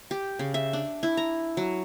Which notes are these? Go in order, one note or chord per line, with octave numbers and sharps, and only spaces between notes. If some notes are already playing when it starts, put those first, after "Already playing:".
G4
C#3
E5
D4
E4
A#5
F#3